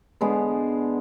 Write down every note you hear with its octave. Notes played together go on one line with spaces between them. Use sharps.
D3 G#3 B3